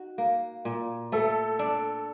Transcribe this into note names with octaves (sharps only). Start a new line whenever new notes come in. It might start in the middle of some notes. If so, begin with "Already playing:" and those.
Already playing: D#4 F#4
A#3
A#2
A3 A4
D4